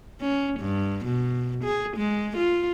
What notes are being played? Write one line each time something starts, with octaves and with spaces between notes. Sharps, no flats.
C#4
G2
B2
G#4
G#3
F4